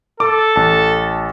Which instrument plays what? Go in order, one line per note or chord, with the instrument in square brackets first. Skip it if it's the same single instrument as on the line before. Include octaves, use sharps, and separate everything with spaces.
[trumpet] A4 [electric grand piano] D6
[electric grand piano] A1 A5